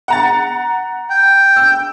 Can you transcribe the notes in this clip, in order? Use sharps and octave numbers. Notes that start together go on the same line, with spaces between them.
F#5 A#5 A6
G5
E6